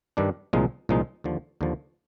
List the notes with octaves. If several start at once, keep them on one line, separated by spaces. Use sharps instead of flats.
G2 D#3 G3 D4
C2 A#2 F3 G#3 D#4
C2 A#2 F3 G#3 D#4
D#2 D3 F3
D#2 D3 F3